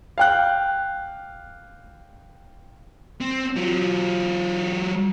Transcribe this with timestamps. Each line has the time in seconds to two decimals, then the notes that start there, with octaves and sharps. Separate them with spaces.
0.18 F5 G5 F#6
3.21 C4
3.56 F#3 F4